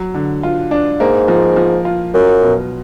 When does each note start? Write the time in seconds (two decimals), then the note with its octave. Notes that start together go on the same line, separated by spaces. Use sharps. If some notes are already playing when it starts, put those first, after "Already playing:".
Already playing: F#3
0.14 D3
0.43 F4
0.71 D4
1.00 G#2 A#3
1.28 F3
1.56 F3
1.85 F4
2.14 F#2 F#3
2.43 B2